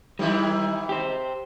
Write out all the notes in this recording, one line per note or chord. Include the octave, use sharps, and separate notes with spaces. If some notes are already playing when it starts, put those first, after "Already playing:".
G#2 D#3 G3 E4
G4 C5